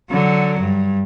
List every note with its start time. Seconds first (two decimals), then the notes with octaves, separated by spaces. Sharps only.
0.10 D3 F#3
0.60 G2